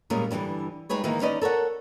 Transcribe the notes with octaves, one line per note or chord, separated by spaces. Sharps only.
A#2 G3 G#3 C#4 G#4 A#4
G2 D3 E3 F3 G3
G3 G#3 D#4 G#4 B4 C#5
D#3 E3 G#3 A#3 D#4
C#4 D#4 B4 D5 D#5
A4 A#4 C#5 F#5